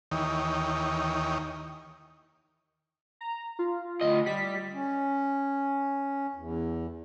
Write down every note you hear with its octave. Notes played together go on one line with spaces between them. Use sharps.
D#2 D#3 E3 C#5 D#5 G5
A#5
F4
D2 D#5
G3 B6
C#4
E2